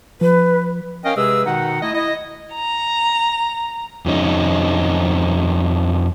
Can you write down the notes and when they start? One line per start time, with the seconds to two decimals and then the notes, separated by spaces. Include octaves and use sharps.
0.21 F3 B4
1.04 C#4 A#4 D#5 F5 G5
1.16 C3 G#3 G#4 B4 E6
1.45 B2 D#3 D#4 F#5
1.82 A3 E4 D#5
1.94 E4 D#5
2.54 A#5
4.06 F2 C#4 D#4